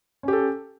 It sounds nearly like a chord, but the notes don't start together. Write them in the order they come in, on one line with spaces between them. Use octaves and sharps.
C#4 G4 A4